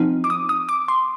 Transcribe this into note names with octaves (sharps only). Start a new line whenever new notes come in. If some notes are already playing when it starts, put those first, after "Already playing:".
Already playing: F3 C4 D#4
D6
D#6
D#6
D6
C6